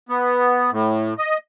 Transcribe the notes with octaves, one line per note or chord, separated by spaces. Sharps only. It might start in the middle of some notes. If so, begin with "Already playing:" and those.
B3
A2
D#5